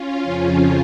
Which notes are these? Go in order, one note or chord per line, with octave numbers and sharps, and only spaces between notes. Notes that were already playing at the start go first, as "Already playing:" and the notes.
Already playing: C#4 F4
F2 C#3 F3